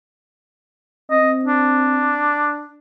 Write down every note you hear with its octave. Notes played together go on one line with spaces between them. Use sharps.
C4 D#5
D4